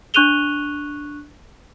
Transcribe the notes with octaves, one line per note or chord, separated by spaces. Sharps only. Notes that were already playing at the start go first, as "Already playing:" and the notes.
D4 C#6 F#6 D#7 F7 G7